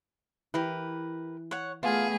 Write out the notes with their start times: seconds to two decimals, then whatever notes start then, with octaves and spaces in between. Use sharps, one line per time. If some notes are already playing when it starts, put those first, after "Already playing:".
0.54 E3 G4 A#4 B4
1.51 C#5 F#5
1.83 A3 B3 F4 G#4 F5